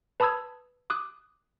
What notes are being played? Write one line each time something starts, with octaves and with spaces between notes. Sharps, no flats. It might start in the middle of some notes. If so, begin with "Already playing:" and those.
B4 A5 B5 D#6 E6 G#6
D6 D#6 F#6